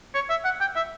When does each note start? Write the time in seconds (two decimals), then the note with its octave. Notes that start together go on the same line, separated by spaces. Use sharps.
0.14 C#5
0.30 E5
0.44 F#5
0.60 G5
0.76 E5